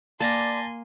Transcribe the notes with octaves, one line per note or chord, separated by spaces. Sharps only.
A#3 D5 G#5 A5 C6 A6 A#6